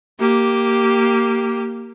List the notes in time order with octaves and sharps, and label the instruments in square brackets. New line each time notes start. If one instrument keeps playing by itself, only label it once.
[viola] A#3 G4